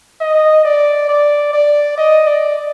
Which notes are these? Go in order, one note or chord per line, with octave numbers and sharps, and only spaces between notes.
D#5
D5
D5
D5
D#5
D5